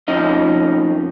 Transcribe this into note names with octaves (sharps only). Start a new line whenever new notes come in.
F2 F3 C#4 D#4 D#5